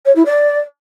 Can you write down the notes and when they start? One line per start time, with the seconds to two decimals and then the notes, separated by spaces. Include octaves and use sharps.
0.05 C#5
0.15 E4
0.25 D5